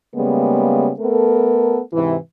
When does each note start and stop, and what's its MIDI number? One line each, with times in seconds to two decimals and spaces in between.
0.15 0.91 49
0.15 0.91 55
0.15 0.91 56
0.15 0.91 58
0.15 0.91 59
1.00 1.79 57
1.00 1.79 59
1.00 1.79 69
1.00 1.79 70
1.93 2.15 44
1.93 2.15 48
1.93 2.15 52